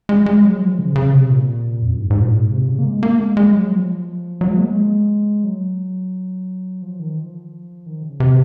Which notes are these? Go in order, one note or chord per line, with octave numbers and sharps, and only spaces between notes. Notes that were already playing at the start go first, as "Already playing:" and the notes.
G#3
G#3
F#3
F3
C#3
C#3
C3
A#2
F2
F#2
G#2
G#2
A#2
G#2
C3
C#3
A#3
G#3
A#3
G#3
G#3
F#3
F3
F#3
G#3
A#3
G#3
F#3
F3
D#3
F3
D#3
C#3
C3